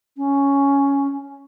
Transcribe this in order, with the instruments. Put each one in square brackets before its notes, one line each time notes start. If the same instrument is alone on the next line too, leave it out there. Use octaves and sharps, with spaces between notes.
[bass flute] C#4